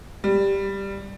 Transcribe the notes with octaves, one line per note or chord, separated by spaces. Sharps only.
G3